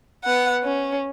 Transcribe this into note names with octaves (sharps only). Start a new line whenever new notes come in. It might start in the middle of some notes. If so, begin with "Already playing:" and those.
B3 F#5
C#4